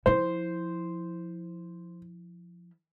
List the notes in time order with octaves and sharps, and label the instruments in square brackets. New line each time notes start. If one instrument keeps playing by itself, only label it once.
[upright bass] F3 E4 [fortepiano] C5